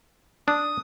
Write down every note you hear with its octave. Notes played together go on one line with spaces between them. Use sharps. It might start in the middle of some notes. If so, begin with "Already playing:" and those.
D4 D#6